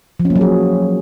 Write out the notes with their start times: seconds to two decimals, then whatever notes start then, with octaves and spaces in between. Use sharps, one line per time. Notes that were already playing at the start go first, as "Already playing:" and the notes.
0.20 F3
0.25 C#4
0.30 A#3
0.36 F#3
0.41 G#4